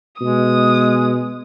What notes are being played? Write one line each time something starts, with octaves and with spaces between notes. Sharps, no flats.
B2 G#3 D#6